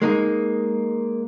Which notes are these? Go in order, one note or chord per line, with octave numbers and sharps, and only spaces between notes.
G#3 A#3 D#4